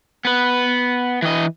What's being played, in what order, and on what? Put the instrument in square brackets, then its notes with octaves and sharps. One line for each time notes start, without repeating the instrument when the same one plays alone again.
[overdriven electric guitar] B3 B4
E3 D#5